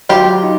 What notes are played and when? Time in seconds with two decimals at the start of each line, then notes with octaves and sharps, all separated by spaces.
0.09 F#3 F4 G4
0.43 D#4